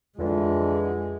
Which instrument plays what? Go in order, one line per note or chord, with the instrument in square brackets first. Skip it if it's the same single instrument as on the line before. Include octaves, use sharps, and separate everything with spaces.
[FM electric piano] F2 [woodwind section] D3 E3 F4 [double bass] G#3